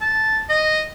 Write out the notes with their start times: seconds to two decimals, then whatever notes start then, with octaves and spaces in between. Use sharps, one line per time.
0.01 A5
0.49 D#5